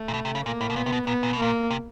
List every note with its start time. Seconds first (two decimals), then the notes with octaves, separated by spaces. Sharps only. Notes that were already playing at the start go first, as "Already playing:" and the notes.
Already playing: A3
0.08 A#2
0.14 B2
0.25 C3
0.35 C#3
0.45 A#2 A#3
0.61 A2
0.70 B2
0.76 A#2 B3
0.86 C3
0.92 B2
1.07 A#2 B3
1.23 A#2
1.33 B2
1.39 A#2 A#3
1.71 C3